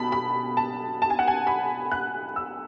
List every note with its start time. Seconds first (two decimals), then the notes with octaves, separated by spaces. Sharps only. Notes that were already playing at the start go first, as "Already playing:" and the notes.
Already playing: B2 A5 B5
0.12 B5
0.57 A5
1.02 A5
1.10 G#5
1.19 F#5
1.28 G#5
1.47 B5
1.91 F#6
2.36 E6